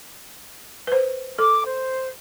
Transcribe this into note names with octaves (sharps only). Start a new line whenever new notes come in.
B4 C5
A4 D6
C5